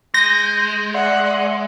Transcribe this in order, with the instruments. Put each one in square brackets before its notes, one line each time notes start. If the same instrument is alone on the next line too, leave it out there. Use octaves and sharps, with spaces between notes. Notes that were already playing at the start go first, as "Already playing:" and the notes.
[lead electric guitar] G#3 [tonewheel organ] G6 [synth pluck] A#6
[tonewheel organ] D5 E5 C6 [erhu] F#5